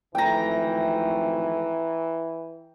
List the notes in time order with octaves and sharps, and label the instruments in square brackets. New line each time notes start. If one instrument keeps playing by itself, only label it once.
[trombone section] G#1 F2 A3 [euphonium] E3 [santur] G5 A#5